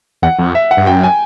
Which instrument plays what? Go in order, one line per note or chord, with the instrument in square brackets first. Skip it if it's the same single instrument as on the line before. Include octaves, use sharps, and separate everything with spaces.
[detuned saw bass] E2 [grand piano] F#5
[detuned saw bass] F2
[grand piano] E5
F#5
[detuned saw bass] G2
[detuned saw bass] F#2 [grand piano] G5
[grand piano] G#5